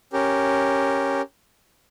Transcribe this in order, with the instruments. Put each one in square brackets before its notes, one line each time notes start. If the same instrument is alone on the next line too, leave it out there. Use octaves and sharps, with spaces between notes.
[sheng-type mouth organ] C#4 G4 A#4